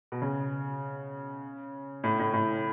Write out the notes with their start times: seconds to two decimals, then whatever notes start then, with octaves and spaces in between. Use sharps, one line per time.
0.12 B2
0.22 C#3
2.04 A2
2.19 A2
2.33 A2